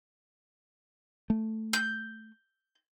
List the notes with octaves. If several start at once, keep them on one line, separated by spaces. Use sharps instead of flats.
A3
G6